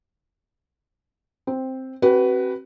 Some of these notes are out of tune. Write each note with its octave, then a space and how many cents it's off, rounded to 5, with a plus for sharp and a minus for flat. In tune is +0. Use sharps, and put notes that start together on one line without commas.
C4 +0 C5 +0
C4 +30 F#4 +35 B4 +0